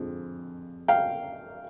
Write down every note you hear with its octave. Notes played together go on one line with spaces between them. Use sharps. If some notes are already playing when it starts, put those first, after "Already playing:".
Already playing: F2 D3 F3 G#3 C4
F5 G5